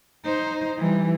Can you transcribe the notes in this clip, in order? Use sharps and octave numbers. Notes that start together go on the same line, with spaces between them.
D#4 C5
E3 G3